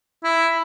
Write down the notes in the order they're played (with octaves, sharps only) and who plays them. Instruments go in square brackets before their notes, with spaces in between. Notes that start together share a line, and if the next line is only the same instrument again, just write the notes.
[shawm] E4